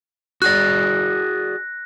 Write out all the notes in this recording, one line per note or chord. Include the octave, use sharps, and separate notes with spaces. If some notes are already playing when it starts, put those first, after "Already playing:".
F#4 G#4 D5 F#6 A#6